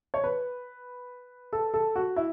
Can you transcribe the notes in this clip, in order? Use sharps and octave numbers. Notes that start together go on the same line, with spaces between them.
C#5
B4
A4
A4
F#4
E4